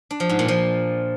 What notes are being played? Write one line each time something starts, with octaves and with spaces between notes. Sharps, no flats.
D4
F3
G#2
A#2
F3